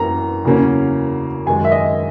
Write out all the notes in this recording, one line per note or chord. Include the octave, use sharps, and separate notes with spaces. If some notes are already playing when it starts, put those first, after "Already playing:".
Already playing: F#2 E3 A#3 C#4 A#5
E2 C#3 F#3 A#3 C#4
F#2 D#3 G#3 G#5
E5
D#5